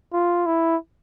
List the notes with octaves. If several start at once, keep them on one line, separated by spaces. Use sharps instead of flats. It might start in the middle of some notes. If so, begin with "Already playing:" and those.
F4
E4